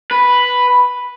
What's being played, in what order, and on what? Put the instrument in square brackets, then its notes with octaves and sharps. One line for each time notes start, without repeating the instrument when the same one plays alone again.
[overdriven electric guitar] B4